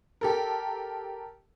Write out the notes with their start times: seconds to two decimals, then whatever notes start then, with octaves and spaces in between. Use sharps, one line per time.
0.21 G4 A4 A#4